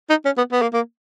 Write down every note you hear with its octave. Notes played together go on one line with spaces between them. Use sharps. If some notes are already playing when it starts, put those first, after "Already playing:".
D#4
C#4
B3
B3
A#3
A#3